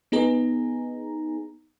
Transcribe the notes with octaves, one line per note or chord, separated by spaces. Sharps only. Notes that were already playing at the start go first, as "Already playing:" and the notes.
B3 D#4 G#4 A#5